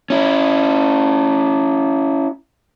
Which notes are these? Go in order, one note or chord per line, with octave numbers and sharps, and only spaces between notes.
C#4 E4